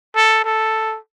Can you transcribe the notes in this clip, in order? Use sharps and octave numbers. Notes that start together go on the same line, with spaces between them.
A4
A4